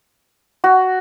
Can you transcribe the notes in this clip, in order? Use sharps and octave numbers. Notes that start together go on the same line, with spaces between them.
F#4